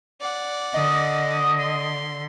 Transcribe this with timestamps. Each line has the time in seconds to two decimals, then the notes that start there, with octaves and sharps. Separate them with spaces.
0.21 D5 F#5
0.74 D3 D#5
1.58 C6